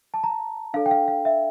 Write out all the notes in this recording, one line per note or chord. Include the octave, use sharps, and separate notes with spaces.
A5
A#5
D4 A4 D5 F5
G5
F5
F5
E5